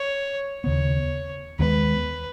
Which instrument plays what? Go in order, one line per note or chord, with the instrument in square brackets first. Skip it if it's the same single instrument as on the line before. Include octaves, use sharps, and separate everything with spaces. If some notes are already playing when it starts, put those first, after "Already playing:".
Already playing: [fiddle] C#5
[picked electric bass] D#2 C#3 B3 [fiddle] C#5
[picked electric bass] D#2 D#3 G#3 B3 [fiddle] B4